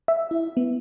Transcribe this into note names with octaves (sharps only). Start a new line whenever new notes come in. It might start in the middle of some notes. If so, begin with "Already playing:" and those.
E5
E4
B3